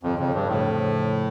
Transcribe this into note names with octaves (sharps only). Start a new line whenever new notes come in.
G1 F2
F2 C#3
G2 C#3
F2 A2